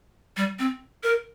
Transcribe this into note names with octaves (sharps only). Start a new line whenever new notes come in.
G3
C4
A#4